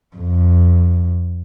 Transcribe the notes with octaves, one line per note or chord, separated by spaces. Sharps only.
F2